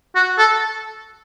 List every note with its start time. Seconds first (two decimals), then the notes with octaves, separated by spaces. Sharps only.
0.15 F#4
0.38 A4